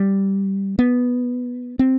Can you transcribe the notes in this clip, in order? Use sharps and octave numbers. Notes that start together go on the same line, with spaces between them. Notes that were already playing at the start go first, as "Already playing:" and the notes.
Already playing: G3
B3
C4